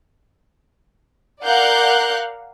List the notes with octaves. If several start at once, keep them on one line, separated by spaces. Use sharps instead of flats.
A#4 D5 F5 F#5 F#6 G6